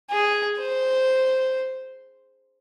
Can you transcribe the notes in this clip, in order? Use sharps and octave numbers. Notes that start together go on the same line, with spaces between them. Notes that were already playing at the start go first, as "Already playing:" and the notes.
G#4
C5